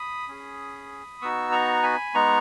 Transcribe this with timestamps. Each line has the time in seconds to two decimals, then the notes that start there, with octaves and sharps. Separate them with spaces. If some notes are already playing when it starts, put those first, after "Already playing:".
Already playing: B5 D#6
0.28 C#4 G#4
1.21 B3 D#4 F#4 C#6 E6
1.52 A#5 C#6
1.83 G#5 B5
2.14 G#3 B3 D#4 A#5 C#6